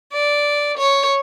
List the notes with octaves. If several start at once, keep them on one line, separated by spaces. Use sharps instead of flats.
D5
C#5